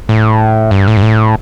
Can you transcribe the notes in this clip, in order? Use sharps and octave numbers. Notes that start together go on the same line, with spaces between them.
A2
G2
A2
G2
A2